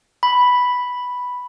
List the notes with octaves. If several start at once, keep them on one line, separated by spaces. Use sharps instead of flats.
B5